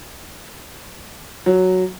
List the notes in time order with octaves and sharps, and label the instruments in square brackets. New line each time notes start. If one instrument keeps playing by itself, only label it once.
[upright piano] F#3